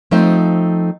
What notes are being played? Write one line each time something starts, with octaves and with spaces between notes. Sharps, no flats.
F3 A3 C4 D#4